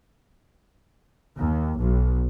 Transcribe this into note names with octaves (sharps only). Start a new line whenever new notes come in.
D#2
B1